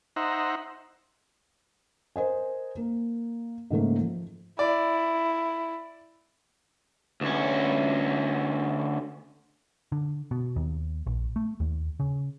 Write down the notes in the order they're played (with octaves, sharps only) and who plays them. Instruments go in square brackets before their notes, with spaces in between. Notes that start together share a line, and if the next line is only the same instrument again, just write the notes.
[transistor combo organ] D#4 C5 E5 F#5 A#5
[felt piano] A#4 C5 D#5 G#5
A#3
G#2 C#3 A3 A#3
F3
[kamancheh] E4 [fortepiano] D5
[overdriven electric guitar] D2 C#4
[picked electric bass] D3
B2
D#2
A#1
A3
D#2
C#3